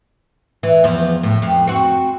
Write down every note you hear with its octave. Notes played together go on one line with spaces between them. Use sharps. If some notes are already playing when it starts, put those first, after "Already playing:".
E3
E2 F3
A2
F2
C4 F#4